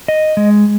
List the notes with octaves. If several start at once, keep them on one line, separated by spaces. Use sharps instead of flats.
D#5
G#3